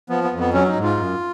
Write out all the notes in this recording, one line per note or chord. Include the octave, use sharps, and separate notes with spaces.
F3 B3
B3
F2
B3
F#3 C#4
D#4
G#2
F4
F#2